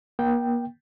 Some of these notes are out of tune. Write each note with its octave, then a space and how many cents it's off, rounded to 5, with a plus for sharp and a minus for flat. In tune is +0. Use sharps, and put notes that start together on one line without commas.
A#3 +40 G5 -5